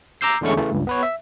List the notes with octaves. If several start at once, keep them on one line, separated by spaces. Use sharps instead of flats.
A#5 D6 E6 G6 C7
E2 D3 G#3 A3 C#4 C#6
C#3 E3 A3
C#2 G2
B3 B4 C#5
E5